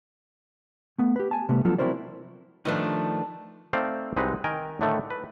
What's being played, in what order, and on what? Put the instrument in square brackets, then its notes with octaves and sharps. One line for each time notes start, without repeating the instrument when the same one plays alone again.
[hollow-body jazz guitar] A3 B3
G4 B4
G#5 A5
C3 G3 A3 B3
F3 F#3 B3 D4 F4 A4
C4 E4 F#4 A#4 C5 D5
[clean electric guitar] D#3 F3 A3 [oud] D4 B4 D#5
[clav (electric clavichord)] A3 C4 D#4 C5 D5 F5
C2 G#3 C4 D#4 F#4 B4
D#3 A#4 G5 G#5
A2 D3 D#3 A3
B4